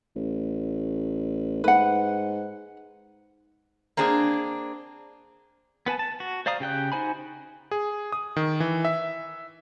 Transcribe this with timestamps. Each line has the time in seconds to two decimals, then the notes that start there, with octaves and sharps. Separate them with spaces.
0.15 A1
1.64 G#2 B4 F#5
3.97 A#3 C4 D4 G#4
5.86 B3 B4 G#5 A5
5.99 A5
6.20 F#4
6.46 C5 D5 F5 A#5 D#6
6.60 C#3 G4 G5 F#6
6.92 D#4 F#4 C5 G#5 B5
7.71 G#4
8.12 D#6
8.36 D#3
8.60 E3
8.85 E5